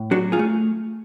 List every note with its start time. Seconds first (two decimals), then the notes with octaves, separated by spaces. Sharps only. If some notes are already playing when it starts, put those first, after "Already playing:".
Already playing: A2
0.11 F#3 D4 F#4
0.32 F4 G#4
0.39 A3